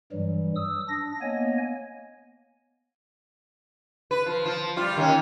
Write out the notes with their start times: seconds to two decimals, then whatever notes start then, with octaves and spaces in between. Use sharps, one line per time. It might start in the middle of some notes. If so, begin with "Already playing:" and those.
0.12 G2 E3 F#3 G3
0.56 D#6 E6
0.89 D4 A#6
1.21 A#3 B3 C#5 D#5 G#5
4.11 B4
4.26 F3
4.45 F3
4.76 G3 F4
4.97 D#3 A#3 C#4